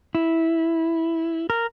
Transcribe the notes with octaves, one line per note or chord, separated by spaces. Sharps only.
E4
A#4